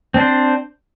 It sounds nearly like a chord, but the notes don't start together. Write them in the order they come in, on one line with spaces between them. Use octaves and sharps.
C4 D4 C5